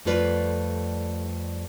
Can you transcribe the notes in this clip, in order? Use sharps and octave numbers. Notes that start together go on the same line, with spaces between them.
F2 G3 A3 F4 B4 D5